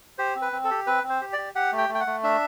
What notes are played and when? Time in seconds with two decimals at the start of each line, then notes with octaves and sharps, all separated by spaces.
0.18 G4 C5
0.36 C4
0.42 B4
0.52 C4
0.64 A4
0.71 G4
0.87 C4 B4
1.03 C4
1.09 C5
1.21 G4
1.33 G4 D5
1.55 G4 F#5
1.72 A3
1.78 G5
1.89 A3
1.95 G5
2.00 F#5
2.07 A3
2.23 D4 E5